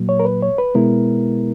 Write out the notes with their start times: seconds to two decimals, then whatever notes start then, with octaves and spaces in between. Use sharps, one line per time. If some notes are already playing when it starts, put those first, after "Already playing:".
Already playing: A#2 F#3 A#3
0.09 C#5
0.20 A#4
0.25 B4
0.42 C#5
0.58 B4
0.75 B2 G#3 B3 E4 A#4